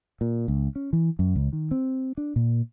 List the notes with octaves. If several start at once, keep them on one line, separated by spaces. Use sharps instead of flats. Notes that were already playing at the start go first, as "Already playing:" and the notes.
A#2
C#2
C#4
E3
F#2
C#2
D#3
C4
D4
A#2